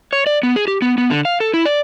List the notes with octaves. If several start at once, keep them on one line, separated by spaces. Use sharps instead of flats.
C#5
D5
B3
G#4
G4
B3
B3
D3
F5
A4
E4
D5